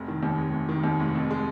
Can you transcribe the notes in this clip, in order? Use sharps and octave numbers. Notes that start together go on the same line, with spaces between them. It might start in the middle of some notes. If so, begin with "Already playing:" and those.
Already playing: F1
D#3
D#2
F1
F1
D#3
D#2
F1
F2
G#3